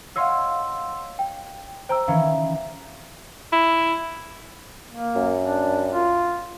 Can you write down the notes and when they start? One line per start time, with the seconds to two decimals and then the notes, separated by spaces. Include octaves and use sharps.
0.16 C#5 D#5 F5 F#5 C6 E6
1.19 G5
1.89 C5 G5 A#5 E6
2.08 D#3 E3 C#4 F5 A#5
3.52 E4
4.92 A#3
5.15 F#2
5.41 D4
5.91 F4